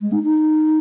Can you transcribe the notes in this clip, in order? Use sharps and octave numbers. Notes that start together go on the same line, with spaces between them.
G#3
D#4
D#4